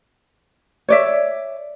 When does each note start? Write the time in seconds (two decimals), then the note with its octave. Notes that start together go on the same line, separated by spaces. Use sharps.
0.89 C#5 D5 E5